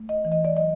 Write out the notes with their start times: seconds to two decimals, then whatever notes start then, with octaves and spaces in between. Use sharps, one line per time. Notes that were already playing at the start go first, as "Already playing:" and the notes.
Already playing: A3
0.09 D#5
0.25 E3
0.32 D#5
0.45 D5
0.56 F#3 D#5